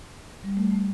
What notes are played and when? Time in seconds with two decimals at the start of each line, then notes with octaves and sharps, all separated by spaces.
0.44 G3
0.57 A3
0.71 A3